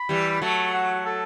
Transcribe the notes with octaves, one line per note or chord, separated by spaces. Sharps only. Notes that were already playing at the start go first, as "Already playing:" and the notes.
Already playing: B5
E3 G3
B5
F#3 A3 A5
F#5
A4